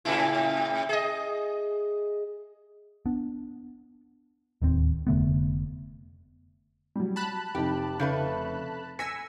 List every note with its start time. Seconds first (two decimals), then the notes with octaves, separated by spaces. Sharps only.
0.05 A2 C#3 E4
0.89 G#4 D#5
3.06 B3 D4
4.62 D1 D#2 C4
5.07 F1 D3 A3 B3
6.96 F#3 G3
7.16 A5 B5 F#6
7.55 F1 D#4 G4
8.00 C#3 A3 B4
8.99 G#5 E6 A#6 B6 C#7